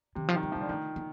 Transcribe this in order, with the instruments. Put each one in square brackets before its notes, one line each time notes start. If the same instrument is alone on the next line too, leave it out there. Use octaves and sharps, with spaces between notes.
[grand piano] C3 [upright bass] D#3
[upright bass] F3
[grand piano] D#3
[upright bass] G3
[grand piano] F3
[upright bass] G3
[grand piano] D3
[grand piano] D#3 [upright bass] A3
[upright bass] A#3